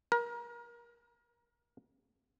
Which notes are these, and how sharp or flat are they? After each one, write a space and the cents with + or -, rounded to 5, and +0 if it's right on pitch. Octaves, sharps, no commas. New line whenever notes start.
A#4 +30